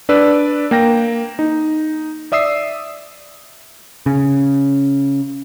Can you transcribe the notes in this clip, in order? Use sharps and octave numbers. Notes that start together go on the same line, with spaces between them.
D4 B4 D5 E6
A#3 G5 A#6
D#4
D5 E5 D#6 E6 C7
C#3